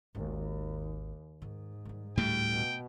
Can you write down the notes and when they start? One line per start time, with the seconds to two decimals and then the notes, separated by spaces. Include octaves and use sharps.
0.15 G#1 D#2
1.42 G#2 D#3
1.85 D#3 G3
2.18 D2 A2 G3 A3 G5
2.52 B2